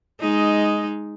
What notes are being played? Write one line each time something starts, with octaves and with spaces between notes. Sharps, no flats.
G#3 D#4